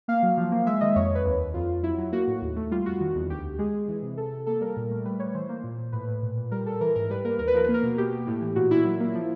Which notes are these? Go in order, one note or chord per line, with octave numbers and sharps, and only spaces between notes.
A#3 F5
F#3
F3
A#3
G#3 E5
D#3 D#5
F2 C#5
F2 B4
D#2
D#2
F2 F4
F2
F#3 E4
F#3
A#3 F#4
A2
D#2
A3
G3 F4
F2 F#4
D#3
E2
D2 G4
D2
G#3 G#4
G#3
E3
C3
C3 A4
C3
A#3 A4
G3 A#4
A#2
A3
G3 B4
G3 C#5
E3 C5
A#3
A#2
A#2
A2 B4
A2
A#2
A#2
G3 A#4
G3 A4
E3 A#4
G#2 A#4
G3 B4
A#3 A#4
D#2 A#4
B4
F3 A#4
B4
A#3
A#4
B2
B2 G4
B2
A2
E3
A#2 F#4
A#2 E4
F#3
A#3
F3